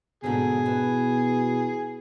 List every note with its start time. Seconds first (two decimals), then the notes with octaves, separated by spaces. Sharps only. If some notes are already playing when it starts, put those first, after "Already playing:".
0.24 G#2 B2 D3 G#4
0.66 E3